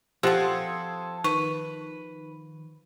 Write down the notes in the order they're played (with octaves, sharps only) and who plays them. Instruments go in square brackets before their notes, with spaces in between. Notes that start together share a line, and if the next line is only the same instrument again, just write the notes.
[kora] F3 F#5 [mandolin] C4 A4 [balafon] G4 [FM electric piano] C6 D#6 G#6
[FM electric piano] D#3 [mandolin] B4 [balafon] C#6